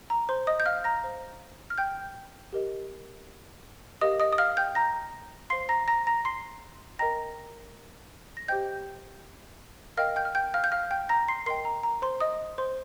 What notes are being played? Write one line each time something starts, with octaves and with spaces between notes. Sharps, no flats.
A#5
C5 C6
D#5 D#6
G6
F5 F6
A#5 A#6
C5 F5
F6
G5 G6
G4 A#4 D#5
G4 A#4 D#5 F5 D#6
D#5 D#6
D#6
F5 F6
G5 G6
A#5 A#6
C5 F5 C6 C7
A#5 A#6
A#5 A#6
A#5 A#6
C6 C7
A#4 D#5 G5 A#5 A#6
A#6
G4 C5 D#5 G5 G6
A#4 D#5 F5 G5 F6
G5 G6
F6
G5 G6
F5 F6
G6
F5 F6
G5 G6
A#5 A#6
C6 C7
A#4 D#5 G5 C6 C7
A#5
A#5
C5 C6
D#5 D#6
C5 C6